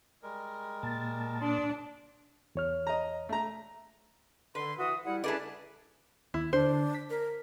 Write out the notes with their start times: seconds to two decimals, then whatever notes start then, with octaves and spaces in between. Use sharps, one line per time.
0.23 G3 G#3 A#4
0.83 A#2 A5
1.41 D4 G#4 C6
2.55 E2 C#5 F6
2.87 D#5 A#5
3.29 A3 A#5
4.55 D3 B4 C6
4.78 E3 F#4 E5 D#6
5.04 G3 E4 F#5
5.24 A3 C#4 D4 E4 G#4 B4 D5
6.34 D#2 E4
6.53 D3 D4 C5
6.95 B6
7.10 A#4